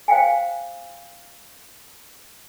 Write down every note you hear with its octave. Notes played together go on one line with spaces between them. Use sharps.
C5 F5 G5 G#5